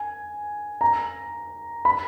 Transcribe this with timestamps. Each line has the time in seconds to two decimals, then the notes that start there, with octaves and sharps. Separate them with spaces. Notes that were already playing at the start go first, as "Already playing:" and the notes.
Already playing: G#5
0.81 A#5
1.85 B5